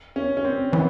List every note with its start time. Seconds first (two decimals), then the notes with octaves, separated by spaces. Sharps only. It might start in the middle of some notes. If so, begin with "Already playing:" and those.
0.16 C#4
0.37 C#4
0.45 C4
0.72 E3 B3